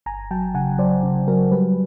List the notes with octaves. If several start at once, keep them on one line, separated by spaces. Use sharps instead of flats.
G1 G#5 A#5
F#3 G5 A5
C#3 F#5 G#5
F#3 C5 D5
C#3
F#3 A#4
G3 B4